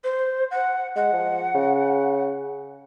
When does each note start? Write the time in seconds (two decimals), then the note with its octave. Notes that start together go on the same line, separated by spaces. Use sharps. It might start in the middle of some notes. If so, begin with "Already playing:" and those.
0.04 C5
0.51 F#5
0.96 G#3 F#5
1.13 F3
1.55 C#3